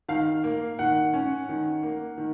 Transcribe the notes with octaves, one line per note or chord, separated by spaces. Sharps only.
D#3 F5
A#3
D#3 F#5
C#4
D#3
A#3
D#3